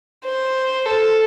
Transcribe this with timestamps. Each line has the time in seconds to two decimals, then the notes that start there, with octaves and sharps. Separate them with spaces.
0.25 C5
0.86 A4